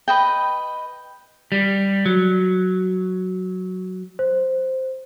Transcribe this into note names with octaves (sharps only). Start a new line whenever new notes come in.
B4 D#5 G5
G3
F#3
C5